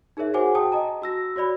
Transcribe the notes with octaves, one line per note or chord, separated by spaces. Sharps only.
D#4 G#4 A#4 C#5 E5
F#4 G#4 C5 F#5 G#5 D6
F#4 G5 A5 D#6
D#5 A5 A#5
F#4 E6 A#6
F#4 C#5 D5 B5